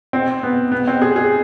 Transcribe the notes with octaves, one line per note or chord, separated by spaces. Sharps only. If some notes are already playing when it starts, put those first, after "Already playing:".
C4
B3
B3
C4
G#4
G#4